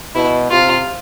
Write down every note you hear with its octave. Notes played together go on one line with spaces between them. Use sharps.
B2 E4
C3 F4